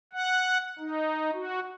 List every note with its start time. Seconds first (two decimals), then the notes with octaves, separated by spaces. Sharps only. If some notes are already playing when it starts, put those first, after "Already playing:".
0.13 F#5
0.79 D#4
1.34 F#4